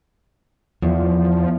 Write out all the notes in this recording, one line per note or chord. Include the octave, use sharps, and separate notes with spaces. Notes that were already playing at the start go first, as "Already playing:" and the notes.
E2 F3